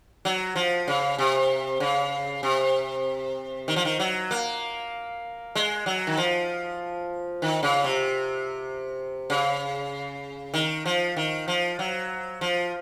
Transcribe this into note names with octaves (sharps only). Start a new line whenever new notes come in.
F#3
F3
C#3
C3
C#3
C3
D#3
F3
D#3
F#3
A#3
G#3
F#3
D#3
F3
D#3
C#3
C3
C#3
D#3
F3
D#3
F3
F#3
F3